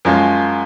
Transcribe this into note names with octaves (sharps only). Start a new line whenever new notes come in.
F#2 F3 G#3 C#4 F4